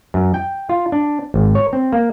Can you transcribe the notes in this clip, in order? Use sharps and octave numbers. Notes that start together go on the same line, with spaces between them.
F#2
G5
F4
D4
G#1
C#5
C4
A#3